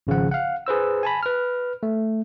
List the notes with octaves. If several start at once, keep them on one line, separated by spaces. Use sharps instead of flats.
G#1 C#3 F3 F#5
F5 F#5
G#4 B4 C5 E6
G#5 A5 B5
B4 F6
A3